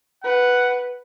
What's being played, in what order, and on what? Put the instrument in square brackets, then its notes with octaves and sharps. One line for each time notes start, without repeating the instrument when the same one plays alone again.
[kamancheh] B4 [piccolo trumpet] F#5